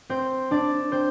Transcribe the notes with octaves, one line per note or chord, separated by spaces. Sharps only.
C4 C5
D4 D5
C4 C5